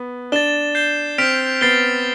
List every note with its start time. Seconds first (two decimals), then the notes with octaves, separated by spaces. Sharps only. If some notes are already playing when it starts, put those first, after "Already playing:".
Already playing: B3
0.32 D4 A6 E7 G7
0.75 G6 C7 E7 G7
1.18 C4 F6 B6 D7 F7
1.61 B3 A6 C7 G7